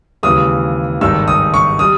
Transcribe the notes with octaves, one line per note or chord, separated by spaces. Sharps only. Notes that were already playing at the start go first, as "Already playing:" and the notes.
D#2 C#3 E3 G#3 D#6
G#1 G2 D#3 G#3 D#4 E6
D#6
C#6
G3 D#6